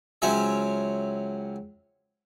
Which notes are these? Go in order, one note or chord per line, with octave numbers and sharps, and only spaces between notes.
C#2 F#3 C4 C#4 E5